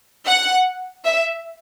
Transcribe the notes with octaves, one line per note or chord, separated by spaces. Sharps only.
F#5
E5